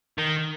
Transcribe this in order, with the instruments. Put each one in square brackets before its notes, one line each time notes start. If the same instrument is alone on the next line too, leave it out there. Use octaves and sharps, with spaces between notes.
[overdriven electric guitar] D#3